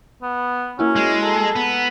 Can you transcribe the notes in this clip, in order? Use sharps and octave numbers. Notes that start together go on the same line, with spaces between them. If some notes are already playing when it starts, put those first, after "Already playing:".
B3
A#3 C#4 E4 F#4
G#3
A4 A5 A#5
B3